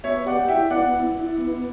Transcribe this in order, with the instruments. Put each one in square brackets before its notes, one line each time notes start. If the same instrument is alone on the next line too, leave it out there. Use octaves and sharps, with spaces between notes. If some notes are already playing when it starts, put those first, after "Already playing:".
[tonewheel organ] B3 [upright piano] C#5 E5
[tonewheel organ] G4 [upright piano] D5 F#5
[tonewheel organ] E4 [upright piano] E5 G5
[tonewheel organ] B3 [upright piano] D5 F#5
[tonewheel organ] E4
E4
B3